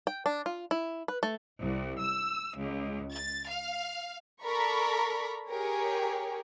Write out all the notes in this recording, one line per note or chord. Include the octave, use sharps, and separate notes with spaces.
G5
D4
F4
E4
B4
A3
C2
E6
C#2
A6
F5
A4 A#4 D5 A#5 B5 C#6
G4 G#4 A#4 C#5